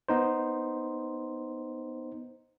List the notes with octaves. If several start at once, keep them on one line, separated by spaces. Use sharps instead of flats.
B3 D#4 C5